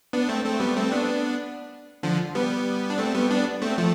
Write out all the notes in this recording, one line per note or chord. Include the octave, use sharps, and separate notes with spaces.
B3 D4
A3 C4
A3 C4
G3 B3
A3 C4
B3 D4
D3 F3
G3 B3
D4
A3 C4
G3 B3
B3 D4
A3 C4
F3 A3